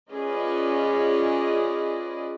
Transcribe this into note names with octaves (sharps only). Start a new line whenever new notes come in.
C#4 F4 G#4 B4 D5 D#5